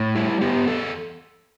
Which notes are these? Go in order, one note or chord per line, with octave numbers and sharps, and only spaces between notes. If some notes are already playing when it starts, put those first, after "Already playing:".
Already playing: A2
G3 E4
B3 G4
E2 A4